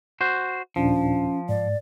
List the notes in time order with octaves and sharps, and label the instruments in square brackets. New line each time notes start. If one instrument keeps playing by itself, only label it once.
[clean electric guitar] F#4 C5
[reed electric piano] D#2 A#2 D4 [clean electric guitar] F3 [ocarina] C#4
[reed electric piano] G#2 [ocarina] D5